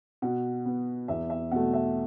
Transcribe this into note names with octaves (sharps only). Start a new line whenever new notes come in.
B2 F#5
B3
E2 E5
E5
B2 A3 F#5
E5